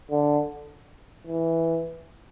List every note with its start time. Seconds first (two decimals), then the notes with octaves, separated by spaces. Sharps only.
0.11 D3
1.27 E3